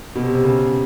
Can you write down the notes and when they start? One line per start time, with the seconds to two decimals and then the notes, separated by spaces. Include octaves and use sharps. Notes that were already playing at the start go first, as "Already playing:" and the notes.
0.15 B2
0.22 C3
0.33 C3
0.44 C#3